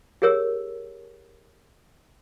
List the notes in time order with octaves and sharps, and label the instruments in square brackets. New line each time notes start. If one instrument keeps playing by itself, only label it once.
[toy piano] G4 G#4 A#4 C#5 E6